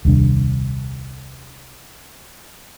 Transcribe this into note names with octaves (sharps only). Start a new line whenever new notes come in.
D#1 C2 D4